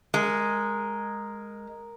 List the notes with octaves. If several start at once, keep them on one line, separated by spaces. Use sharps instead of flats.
G#3 A#4